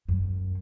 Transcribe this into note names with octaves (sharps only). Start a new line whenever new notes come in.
F#2